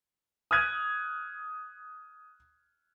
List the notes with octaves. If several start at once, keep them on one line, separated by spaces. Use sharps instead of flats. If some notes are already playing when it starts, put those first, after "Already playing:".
D#6 F6 F#6 G#6 D#7